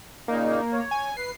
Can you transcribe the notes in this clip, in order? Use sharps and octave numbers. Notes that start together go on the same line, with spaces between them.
A#2 C#3 A#3 D#4
C#5
G#5
B4 C7